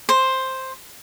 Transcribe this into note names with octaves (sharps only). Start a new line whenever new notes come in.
C5